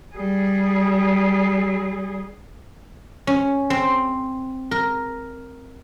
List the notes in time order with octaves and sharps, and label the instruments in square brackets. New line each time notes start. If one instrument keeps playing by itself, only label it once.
[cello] G3 G#4
[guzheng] C#4
C4
A#4